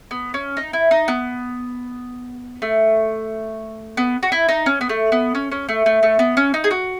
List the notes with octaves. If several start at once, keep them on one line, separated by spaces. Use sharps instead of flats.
B3
C#4
D#4
E4
D#4
B3
A3
B3
F#4
E4
D#4
C#4
B3
A3
B3
C#4
C#4
A3
A3
A3
B3
C#4
D#4
G#4
F#4